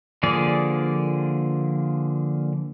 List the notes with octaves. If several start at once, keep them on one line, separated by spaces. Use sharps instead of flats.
D3 F3 A#3 G#4 D5